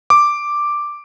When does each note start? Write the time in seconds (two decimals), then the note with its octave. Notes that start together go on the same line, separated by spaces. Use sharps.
0.10 D6